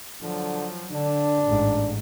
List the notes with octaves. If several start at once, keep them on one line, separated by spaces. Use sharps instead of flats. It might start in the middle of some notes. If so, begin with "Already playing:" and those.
D3 F3 F#3
D3 D4
A1 G#2